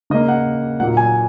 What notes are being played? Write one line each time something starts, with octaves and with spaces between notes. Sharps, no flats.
C#3 A#3 D#5
F#5
A#2 F#3 A#3 F#5
G#5